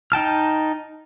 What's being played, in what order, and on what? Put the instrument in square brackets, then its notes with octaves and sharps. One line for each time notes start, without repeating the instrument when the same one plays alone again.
[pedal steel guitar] D#4 G5 A5 F6